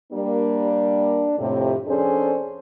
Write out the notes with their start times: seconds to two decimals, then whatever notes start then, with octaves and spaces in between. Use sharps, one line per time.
0.13 G3 A#3 D4
1.39 F2 A2 C3
1.87 F2 C#4 D4 G#4 A4 C5